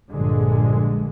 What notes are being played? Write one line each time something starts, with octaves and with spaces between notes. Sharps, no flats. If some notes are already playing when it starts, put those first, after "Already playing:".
A#1 G2 D3 G#3